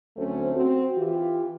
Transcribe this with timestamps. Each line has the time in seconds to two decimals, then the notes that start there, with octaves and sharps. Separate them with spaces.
0.17 D2 F#3 A3 C4 C#4 C5
0.55 C4 F#4
0.97 E3 F4 G4